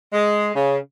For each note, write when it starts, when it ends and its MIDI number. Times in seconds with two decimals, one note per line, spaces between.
0.13 0.51 56
0.56 0.78 49